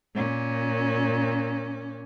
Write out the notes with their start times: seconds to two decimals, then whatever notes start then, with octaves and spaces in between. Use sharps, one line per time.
0.15 A#2 C#4